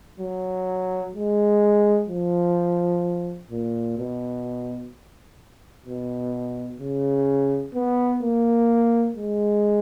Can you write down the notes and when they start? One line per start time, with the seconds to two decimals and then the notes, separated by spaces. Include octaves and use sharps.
0.20 F#3
1.15 G#3
2.08 F3
3.51 A#2
3.98 B2
5.86 B2
6.80 C#3
7.74 B3
8.22 A#3
9.17 G#3